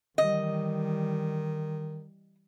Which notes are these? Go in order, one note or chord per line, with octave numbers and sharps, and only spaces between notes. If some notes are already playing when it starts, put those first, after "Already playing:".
D#3 E3 G3 D#5